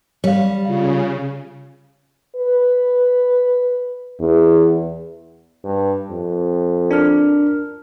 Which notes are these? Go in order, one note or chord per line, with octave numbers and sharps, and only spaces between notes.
G3 C#5 F5
C#3 F4 F5
B4
E2
G2
F2
D4 A#4 F6